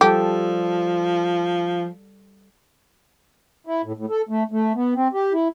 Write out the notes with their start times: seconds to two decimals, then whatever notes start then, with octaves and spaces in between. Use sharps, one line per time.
0.01 F3 G3 G4 A4
3.67 E4
3.84 A2
3.97 A2
4.10 A4
4.29 A3
4.51 A3
4.75 B3
4.96 C4
5.13 G4
5.33 E4